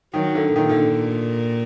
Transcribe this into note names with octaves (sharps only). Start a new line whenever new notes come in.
D#3 F#3
D3
A#2 D#3
D3